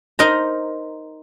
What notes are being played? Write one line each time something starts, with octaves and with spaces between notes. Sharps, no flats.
D#4 A#4 C5 A#5